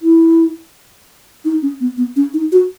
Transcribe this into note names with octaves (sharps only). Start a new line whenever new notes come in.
E4
D#4
C#4
B3
B3
C#4
D#4
F#4